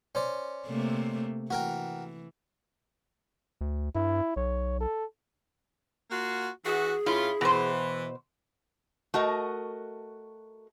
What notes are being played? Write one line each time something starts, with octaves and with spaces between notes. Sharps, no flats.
C#4 C5 D5
C3 A3 A#3
E3 F#4 A#4 G5
D2
G2 E4
B1 C#5
A4
A#3 F4 F#4
E3 F#4 G#4
G2 C#4 E4 F4
B2 E3 C5
A3 F#4 A#4 D#5